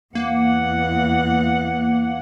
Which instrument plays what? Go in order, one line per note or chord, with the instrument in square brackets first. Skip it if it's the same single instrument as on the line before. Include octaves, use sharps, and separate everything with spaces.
[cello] E2 F#5 [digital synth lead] A#3